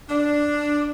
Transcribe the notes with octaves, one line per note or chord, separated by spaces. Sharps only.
D4